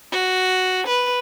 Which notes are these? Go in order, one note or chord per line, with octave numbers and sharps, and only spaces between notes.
F#4
B4